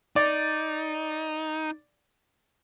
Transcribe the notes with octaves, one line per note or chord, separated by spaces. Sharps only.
D#4 D5